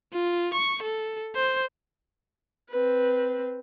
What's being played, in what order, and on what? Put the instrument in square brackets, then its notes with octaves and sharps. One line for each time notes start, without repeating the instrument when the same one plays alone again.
[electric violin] F4
C#6
A4
C5
[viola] C4 B4